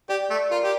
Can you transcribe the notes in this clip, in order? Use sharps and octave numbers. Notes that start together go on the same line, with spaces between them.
G4 D5
A3
F4 A#4
G4